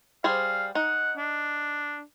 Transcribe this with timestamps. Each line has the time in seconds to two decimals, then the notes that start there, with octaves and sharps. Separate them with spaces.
0.24 G3 G#4 C5 F5
0.75 D#4 F#5
1.17 D4